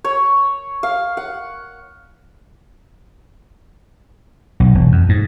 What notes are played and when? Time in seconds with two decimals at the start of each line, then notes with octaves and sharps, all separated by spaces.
0.04 C#5
0.83 F5
1.17 F#5
4.60 B1
4.75 E1
4.92 F2
5.09 G#2